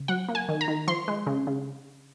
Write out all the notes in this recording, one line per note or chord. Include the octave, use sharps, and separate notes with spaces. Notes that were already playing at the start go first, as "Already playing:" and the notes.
Already playing: C#3
F#3 F#5
A#3
G#5
D#3
A#5
D#3
F3 C6
G#3
C#3
C#3